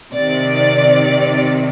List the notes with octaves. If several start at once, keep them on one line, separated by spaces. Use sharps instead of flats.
C3 D#3 D5